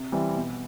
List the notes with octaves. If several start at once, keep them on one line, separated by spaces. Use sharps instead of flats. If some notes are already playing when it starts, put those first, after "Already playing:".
Already playing: C3
E3 G3 C4
B2